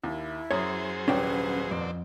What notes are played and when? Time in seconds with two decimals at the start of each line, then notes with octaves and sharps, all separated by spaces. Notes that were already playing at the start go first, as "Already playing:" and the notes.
0.04 D#2 E4
0.51 F#2 F#3 G#4 C5 C#5 D#6
1.08 D#1 C2 C#4 D4 B4 G5
1.71 F2 C4 D5